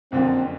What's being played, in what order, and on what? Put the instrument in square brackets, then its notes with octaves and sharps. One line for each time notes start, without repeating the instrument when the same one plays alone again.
[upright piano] F#1 F2 D3 F3 A#3 [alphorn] C4